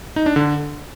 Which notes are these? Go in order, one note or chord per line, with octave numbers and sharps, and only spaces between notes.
D#4
D4
D3